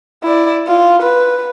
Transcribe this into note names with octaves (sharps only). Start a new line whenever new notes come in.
E4 D5
F4
B4